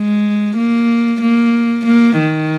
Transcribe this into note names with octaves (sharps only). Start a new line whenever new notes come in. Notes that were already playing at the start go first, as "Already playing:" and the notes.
Already playing: G#3
A#3
A#3
A#3
D#3